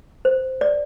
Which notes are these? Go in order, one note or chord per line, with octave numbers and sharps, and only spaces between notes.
C5
D5